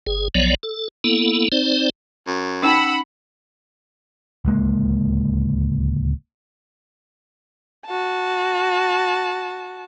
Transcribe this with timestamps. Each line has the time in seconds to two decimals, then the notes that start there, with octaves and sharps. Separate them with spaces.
0.07 G1 G#4
0.35 B1 F3 F#3 B3 C#5 D5
0.63 A4
1.04 A#3 B3 E4 A4
1.52 C4 D#4 C5 D5
2.27 F#2
2.63 C#4 D#4 F#5 B5 E6
4.45 D1 C#2 G#3 A#3
7.86 F#4 A5